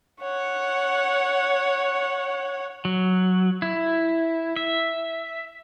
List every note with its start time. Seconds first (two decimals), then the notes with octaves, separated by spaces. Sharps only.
0.20 C#5 F#5
2.85 F#3
3.62 E4
4.56 E5